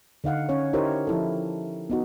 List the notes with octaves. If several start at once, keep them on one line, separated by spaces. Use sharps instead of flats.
D3 D#4 F5 F#5
C#4 C#5
D#4 E4 G4 A#4 C5 C#5
F3 E4 A4
B3 D#4 F#4